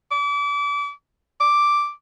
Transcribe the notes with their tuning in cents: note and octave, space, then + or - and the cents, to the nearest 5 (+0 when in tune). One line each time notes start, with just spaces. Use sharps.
D6 -35
D6 +0